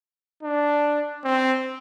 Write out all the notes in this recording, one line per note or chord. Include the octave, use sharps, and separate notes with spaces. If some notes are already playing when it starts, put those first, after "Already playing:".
D4
C4